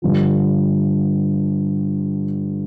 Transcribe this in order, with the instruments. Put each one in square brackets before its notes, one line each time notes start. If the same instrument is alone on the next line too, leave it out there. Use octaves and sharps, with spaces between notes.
[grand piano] G2 D3 F3